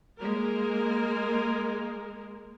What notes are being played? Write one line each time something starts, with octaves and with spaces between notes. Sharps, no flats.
G#3 A#3 A#4